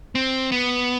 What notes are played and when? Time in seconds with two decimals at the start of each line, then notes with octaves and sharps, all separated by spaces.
0.15 C4
0.52 B3